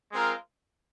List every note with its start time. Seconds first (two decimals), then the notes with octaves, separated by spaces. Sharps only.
0.12 G#3 C4 F4 A#4